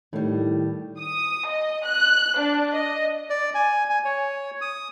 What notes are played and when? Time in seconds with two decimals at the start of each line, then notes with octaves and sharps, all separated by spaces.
0.13 A2 D#3 G3
1.00 D#6
1.50 D#5
1.87 F#6
2.39 D4
2.72 D#5
3.30 D5
3.55 G#5
3.90 G#5
4.05 C#5
4.61 D#6